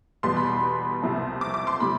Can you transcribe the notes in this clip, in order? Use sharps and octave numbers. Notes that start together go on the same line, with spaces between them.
E2 B2 G3 B3 C6
B5
C2 C3 F3
D6
D6
C6
C3 G3 B5